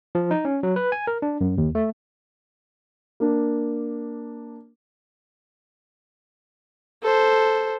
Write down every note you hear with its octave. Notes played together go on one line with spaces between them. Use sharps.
F3
D#4
C#4
F#3
B4
G#5
A#4
D4
F#2
D#2
A3
A#3 D4
A4 C5